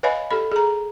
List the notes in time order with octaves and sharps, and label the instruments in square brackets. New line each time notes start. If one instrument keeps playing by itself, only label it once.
[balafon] B4 C#5 D#5 F5 G#5 B5
G4 A4 B5
G#4 A#5